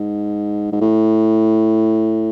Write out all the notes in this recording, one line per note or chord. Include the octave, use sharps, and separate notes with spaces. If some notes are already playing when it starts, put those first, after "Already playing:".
Already playing: G#2
G#2
A2